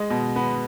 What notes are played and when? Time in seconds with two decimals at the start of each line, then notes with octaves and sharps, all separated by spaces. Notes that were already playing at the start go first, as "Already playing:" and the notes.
Already playing: G#3 D#5
0.10 B2
0.36 B3